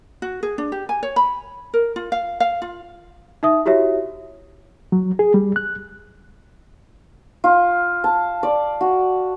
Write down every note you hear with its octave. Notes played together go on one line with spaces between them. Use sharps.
F#4
G#4
D4
G4
G#5
C#5
B5
A#4
F4
F5
F5
F4
D#4 E5 D#6
E4 F#4 G4 C#5 E5
F#3
G#4
G3
F#6
F4
A5
D5
F#4